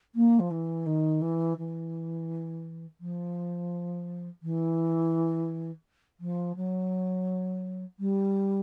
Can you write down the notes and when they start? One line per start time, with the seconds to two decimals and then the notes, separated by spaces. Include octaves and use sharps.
0.15 A#3
0.39 F3
0.50 E3
0.86 D#3
1.21 E3
1.58 E3
3.00 F3
4.43 E3
6.20 F3
6.56 F#3
7.99 G3